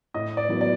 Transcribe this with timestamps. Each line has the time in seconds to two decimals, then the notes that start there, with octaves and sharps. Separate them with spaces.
0.14 A2 D#5
0.37 D5
0.49 F#3 B3 E4
0.61 D5